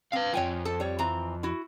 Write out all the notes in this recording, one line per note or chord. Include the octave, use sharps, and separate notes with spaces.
C4 B4 F5
F2 F3 C#5 G5 G#5
A4 A5
G3 C#5
E3 C4 A#5
E4 F#4